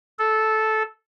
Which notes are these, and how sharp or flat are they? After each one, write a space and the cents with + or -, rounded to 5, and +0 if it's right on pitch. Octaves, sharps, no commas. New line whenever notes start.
A4 -10